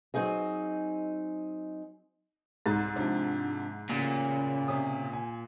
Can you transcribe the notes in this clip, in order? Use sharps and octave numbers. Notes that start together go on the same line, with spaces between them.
F#3 C4 D#4 G#4 D#5
C2 G#2 A#5 A6
C3 F3 D4
A1 A#2 C#3
C3 C#4 D#6
G#5